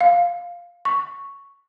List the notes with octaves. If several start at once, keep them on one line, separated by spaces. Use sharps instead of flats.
F5
C#6